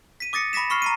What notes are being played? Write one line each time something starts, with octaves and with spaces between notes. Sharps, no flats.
B6 D#7
D6 D#6 A6 A#6 C#7
B5 D6 A#6 B6 E7
B5 C#6 F6 C7
A#5 C7 D#7